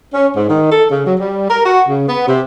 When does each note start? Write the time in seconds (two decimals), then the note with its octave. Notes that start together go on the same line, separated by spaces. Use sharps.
0.14 C#4
0.35 G#2
0.49 D#3
0.70 A4
0.90 C#3
1.06 F#3
1.18 G3
1.48 A#4
1.65 F#4
1.88 C#3
2.07 B3
2.27 C3